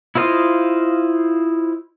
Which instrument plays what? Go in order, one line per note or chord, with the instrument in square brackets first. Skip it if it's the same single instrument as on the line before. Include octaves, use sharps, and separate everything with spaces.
[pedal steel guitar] E4 F4 C5 D#5 F5